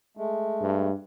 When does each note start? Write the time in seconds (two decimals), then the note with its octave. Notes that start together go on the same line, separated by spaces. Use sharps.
0.17 G#3 A3
0.61 G2